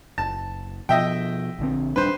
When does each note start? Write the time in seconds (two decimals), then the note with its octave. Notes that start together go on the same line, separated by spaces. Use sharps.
0.18 F#1 A5
0.89 B2 F3 D#5 E5 G5
1.59 A#1 D3 C4
1.96 D#1 G3 D4 B4 C5